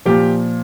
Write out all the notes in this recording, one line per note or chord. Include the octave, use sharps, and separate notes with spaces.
A#2 F3 G4